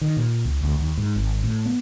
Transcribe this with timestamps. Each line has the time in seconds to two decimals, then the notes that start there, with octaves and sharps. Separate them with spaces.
0.01 D#3
0.17 A#2
0.45 C#2
0.63 D2
0.79 D#2
0.97 G#2
1.16 G#1
1.44 A2
1.65 B3